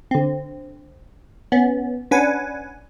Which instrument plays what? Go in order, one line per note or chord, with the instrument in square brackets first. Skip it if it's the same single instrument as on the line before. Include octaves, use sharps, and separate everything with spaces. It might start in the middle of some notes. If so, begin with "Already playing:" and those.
[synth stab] D3 C4
B3 C#4
C#4 D4 B4 F#5 G#5